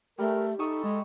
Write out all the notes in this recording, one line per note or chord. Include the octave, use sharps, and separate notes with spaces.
G3 A3 A#4
D#4 A4 E5 C#6 D#6
G#3